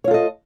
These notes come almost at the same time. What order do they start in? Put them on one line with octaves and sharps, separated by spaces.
C#5 F4 A4 D#5